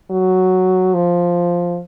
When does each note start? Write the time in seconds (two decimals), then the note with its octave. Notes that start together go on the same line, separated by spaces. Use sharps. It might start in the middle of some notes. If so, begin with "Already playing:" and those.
0.10 F#3
0.95 F3